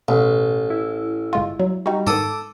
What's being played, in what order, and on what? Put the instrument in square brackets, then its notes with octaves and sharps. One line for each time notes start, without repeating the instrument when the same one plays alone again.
[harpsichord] A1 [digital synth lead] B2
[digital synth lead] E4
[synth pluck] G1 G#3 F4
F#3
[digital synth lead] G3 [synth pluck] D#4 F#4
[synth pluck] G#2 D#3 [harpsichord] A4 D#6 [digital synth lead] D6